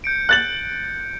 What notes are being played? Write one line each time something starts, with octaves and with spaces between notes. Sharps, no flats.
G6 C#7 D7
F#6 A6 F#7